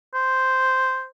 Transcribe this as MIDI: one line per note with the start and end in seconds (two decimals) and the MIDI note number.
0.14 1.05 72